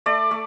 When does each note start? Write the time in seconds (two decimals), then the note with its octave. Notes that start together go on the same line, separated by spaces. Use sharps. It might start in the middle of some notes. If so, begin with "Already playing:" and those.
0.06 A3 D5
0.31 A3